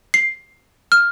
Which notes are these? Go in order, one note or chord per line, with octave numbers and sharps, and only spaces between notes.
C7
F6